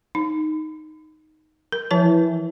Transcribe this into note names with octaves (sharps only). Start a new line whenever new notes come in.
D#4
A#4
E3 F3 C#5 A5